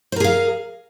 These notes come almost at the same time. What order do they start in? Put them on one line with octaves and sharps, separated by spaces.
C5 A#4 G#4 F5